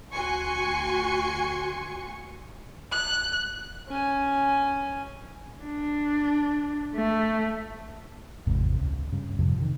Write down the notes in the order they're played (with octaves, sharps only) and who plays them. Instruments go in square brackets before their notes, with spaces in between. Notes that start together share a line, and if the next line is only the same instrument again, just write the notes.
[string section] D2 F#4 G#5 C6 C#6 C#7
[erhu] F#6
[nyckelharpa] C#4 G#5
[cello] D4
A3
[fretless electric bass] G#1 E2 G#2 C3
C#2
G2 C#3
F2 G#2 C3 F3
C3 D#3